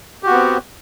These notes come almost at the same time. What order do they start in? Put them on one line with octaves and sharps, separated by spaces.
G4 F#4 B3 C4